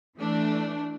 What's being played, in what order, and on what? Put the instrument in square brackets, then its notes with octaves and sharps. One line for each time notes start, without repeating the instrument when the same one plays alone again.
[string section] E3 A3 D4